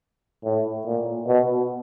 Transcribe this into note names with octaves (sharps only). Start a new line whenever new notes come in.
A2
A#2
B2